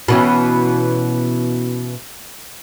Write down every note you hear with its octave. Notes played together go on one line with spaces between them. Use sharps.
B2 E3 C#4